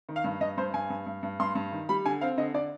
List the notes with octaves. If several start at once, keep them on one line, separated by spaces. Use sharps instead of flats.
D#3
F5
G2
G2 D#5
G2 C5
G2 G#5
G2
G2
G2
G2 C6
G2
D#3
G3 B5
D3 G#5
C4 F5
D3 D#5
D3 D5